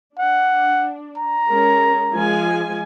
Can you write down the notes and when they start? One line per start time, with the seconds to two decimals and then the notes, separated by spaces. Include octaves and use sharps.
0.19 D4 F#5
1.18 A#5
1.50 G#3 C#4 A#4
2.12 F3 G#3 G#5